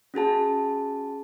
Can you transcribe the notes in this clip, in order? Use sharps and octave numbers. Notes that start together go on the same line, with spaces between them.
C#4 F#4 G#4 A5